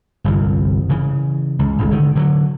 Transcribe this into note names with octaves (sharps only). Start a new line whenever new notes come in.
G1 C2 F2 E3
C#3 E3
C#2
D#1 G#1 C#2 A#2
D3 D#3
D3 F3 F#3